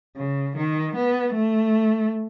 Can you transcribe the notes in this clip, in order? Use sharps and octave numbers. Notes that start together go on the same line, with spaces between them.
C#3
D#3
B3
A3